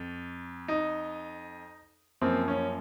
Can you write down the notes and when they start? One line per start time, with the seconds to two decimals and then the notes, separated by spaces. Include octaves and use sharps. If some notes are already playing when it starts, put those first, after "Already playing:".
Already playing: F2
0.68 D#4
2.21 F#2 F3 A#3 C4
2.48 C#4